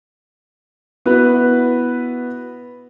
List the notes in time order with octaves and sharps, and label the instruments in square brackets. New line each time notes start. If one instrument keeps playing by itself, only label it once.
[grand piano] B3 E4 F#4 B4